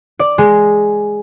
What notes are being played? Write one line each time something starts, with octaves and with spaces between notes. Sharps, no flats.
D5
G#3